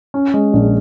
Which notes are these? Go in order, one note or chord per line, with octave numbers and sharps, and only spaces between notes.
C#4
G#3
A#1